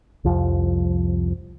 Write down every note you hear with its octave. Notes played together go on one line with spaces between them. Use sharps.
C2 F2 F3